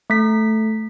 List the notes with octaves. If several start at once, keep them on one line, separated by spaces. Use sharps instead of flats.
A3 B6